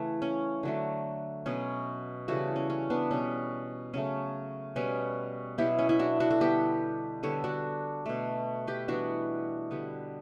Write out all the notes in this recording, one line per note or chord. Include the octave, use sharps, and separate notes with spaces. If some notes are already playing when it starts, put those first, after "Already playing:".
Already playing: C#3 E3 A3
C#4
D3 F#3 A3
B2 F#3 B3 C#4
C#3 E3 G3 F#4 A4
C#4
C#4
B3 D4
B2 G3 B3 C#4
C#3 F#3 A3 C#4
B2 G3 B3 C#4
B2 F#3 B3 E4 G4
C#4
C#4 E4
D4 F#4
D4 F#4
F#4 A4
D3 G3 B3 G4 B4
D3 G3 B3 A4 C#5
D4 F#4
B2 A3
G4 B4
E3 G3 B3 D4 F#4
D3 G3 B3